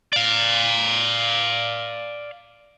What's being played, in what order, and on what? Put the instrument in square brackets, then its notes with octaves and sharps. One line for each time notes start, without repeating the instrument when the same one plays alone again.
[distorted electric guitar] D5 F5